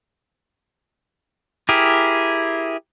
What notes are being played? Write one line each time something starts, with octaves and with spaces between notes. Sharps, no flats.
E4 G4 G#4 A#4